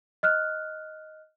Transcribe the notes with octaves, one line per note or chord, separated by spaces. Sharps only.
D#5 F6 F#6